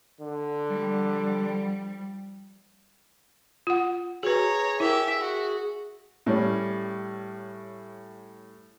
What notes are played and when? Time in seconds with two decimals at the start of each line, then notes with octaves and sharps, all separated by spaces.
0.21 D3
0.71 F3 G3
3.67 F4 F#5
4.23 F#4 G#4 B4 C#5 A#5
4.80 E4 G4 A#4 E5
5.20 F#4
6.26 A2 G3 C#4